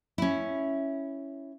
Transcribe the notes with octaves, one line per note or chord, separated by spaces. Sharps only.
C#4 E4